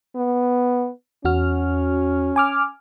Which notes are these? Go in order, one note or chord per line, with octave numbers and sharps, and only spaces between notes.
B3
E2 C#4 F#4 F6
G#5 D6 F6